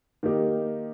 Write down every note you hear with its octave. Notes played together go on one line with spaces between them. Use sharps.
D#3 A#3 D#4 G4